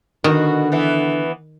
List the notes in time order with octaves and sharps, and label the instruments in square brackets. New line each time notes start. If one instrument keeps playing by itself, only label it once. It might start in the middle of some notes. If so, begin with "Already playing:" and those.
[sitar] B2 F#4 [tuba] D3 [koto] D#3
[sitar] E3 B3